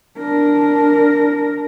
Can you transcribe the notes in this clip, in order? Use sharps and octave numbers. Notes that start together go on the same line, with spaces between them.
D4 A#4